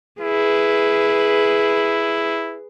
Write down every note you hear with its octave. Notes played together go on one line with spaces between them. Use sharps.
E4 G#4 B4